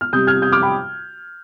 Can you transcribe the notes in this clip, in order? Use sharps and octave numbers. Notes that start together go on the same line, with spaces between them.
F6
C3 G3 D#6 G6
F6 G#6
D#6 G6
D6 F6
G5 B5